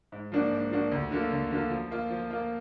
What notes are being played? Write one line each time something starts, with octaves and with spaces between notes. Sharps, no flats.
G#2
F3 A#3 D4 F#4
G#2
F3 A#3 D4 F#4
D2
D3 F#3 A#3 F4
D2
D3 F#3 A#3 F4
F3
A#3 F4
F3
A#3 F4